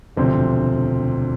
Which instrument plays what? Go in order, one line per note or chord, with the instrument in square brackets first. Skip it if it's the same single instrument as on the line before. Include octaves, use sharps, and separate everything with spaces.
[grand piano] E1 D2 C3 F3 C4